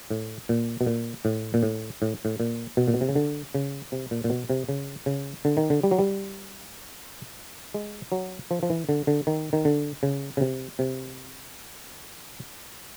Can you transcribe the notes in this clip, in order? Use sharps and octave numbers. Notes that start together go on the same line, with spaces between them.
A2
A#2
B2
A#2
A2
A#2
A2
A2
A2
A#2
B2
A#2
B2
C3
C#3
D3
C#3
C3
A#2
A#2
B2
C3
C#3
C#3
D3
D#3
D3
G3
F#3
G3
G#3
F#3
F3
F3
E3
D3
D3
D#3
D#3
D3
C#3
C#3
C3
C3